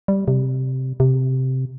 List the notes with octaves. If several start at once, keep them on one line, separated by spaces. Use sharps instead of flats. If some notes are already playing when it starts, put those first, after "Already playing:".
G3
C3
C3